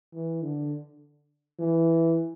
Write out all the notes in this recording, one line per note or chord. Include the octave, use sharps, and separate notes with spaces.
E3
D3
E3